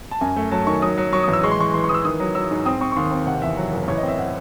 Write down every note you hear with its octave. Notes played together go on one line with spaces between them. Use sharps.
A5
F#2 G#5
A3
F#3 A5
D#3 C#6
F#3 D#6
F#3
F#3 C#6
A1 D#6
E6
G#3 C#6
C6
E3 C#6
E3 C6
C#6
E3 D#6
E6
D#3 D#6
F#3
F#3 E6
G#2
C4 D#6
C4 C#6
C#6
D#2 C6
C4
C3 F#5
E2 E5
F#3
F#1
A1 C#5
D#5
C4
E5
F#5